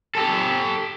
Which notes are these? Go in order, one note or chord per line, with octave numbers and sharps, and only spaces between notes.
G4 A4